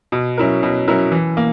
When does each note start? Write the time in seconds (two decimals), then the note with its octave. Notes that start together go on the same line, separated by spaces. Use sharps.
0.12 B2
0.38 F#3 C#4 E4 A#4
0.63 B2
0.88 F#3 C#4 E4 A#4
1.12 E3
1.37 A#3